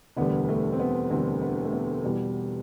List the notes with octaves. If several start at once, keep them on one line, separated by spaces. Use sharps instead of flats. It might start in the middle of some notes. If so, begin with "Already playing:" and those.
E1 D2 D3 G3 B3
A3
C4
B3
E1 D2 D3 G3 C4
B3
A3
B3
E2 B2 G3